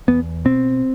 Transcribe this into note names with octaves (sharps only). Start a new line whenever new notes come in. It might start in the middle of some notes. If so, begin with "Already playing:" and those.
E2 B3
B2 C4